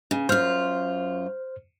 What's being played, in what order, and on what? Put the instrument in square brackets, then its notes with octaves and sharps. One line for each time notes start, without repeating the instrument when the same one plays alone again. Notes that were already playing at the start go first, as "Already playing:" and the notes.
[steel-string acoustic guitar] C#3
[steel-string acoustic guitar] F#2 F4 [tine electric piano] C5 F6